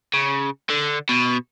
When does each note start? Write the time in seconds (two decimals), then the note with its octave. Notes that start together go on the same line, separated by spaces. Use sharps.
0.14 C#3
0.70 D3
1.09 B2